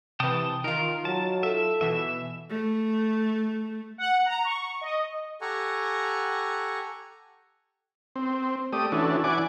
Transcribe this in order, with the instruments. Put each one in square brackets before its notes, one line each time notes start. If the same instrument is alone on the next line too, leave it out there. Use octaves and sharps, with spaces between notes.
[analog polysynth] C3 E3 [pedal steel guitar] G5 A5 D#6
[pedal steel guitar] D#3 A#4 [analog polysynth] D#4 F4
[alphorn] F#3 [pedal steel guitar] A5
[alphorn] A4 [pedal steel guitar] E5
[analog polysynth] B2 E3 [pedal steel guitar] E5
[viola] A3
[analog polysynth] F#5
A#5
C#6
D#5
[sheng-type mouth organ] G4 A4 F#5 G#5 A#5 C#6
[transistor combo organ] C4
A3 G4 D5 D#6
E3 C#4 D4 F#4 A4
E3 D5 F#5 G#5 D6